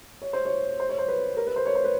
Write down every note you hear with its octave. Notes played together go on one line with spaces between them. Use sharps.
C#5
C5
C#5
C5
C#5
C5
B4
A#4
B4
C5
C#5
C5
B4